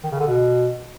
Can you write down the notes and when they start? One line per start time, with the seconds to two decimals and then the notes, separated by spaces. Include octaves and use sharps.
0.04 D#3
0.12 C#3
0.20 D3
0.28 B2